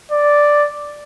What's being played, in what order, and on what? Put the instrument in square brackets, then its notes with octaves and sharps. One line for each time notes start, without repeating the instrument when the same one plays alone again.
[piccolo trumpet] D5